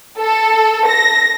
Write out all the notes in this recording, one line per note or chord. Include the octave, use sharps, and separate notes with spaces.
A4
A#6